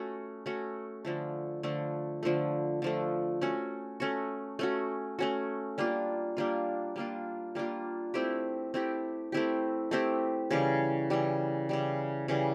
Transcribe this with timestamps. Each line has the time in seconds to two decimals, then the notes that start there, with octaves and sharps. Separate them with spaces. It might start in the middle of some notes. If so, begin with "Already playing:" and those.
Already playing: A3 C#4 F#4
0.46 A3 C#4 F#4
1.05 D3 F3 A3
1.63 D3 F3 A3
2.23 D3 F3 A3
2.82 D3 F3 A3
3.41 A3 C#4 F#4
4.00 A3 C#4 F#4
4.59 A3 C#4 F#4
5.19 A3 C#4 F#4
5.78 G3 A#3 D4 F4
6.37 G3 A#3 D4 F4
6.96 G3 A#3 D4 F4
7.55 G3 A#3 D4 F4
8.14 A3 C4 E4 G4
8.74 A3 C4 E4 G4
9.32 A3 C4 E4 G4
9.91 A3 C4 E4 G4
10.51 C#3 E3 G3
11.10 C#3 E3 G3
11.69 C#3 E3 G3
12.28 C#3 E3 G3